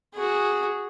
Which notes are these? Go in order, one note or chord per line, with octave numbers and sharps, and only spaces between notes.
F#4 G#4